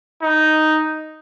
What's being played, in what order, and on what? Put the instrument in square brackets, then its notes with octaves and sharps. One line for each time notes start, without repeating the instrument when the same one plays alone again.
[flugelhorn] D#4